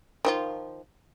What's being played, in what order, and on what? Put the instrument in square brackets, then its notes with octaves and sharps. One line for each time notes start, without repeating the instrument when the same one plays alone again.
[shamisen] D#3 F3 F4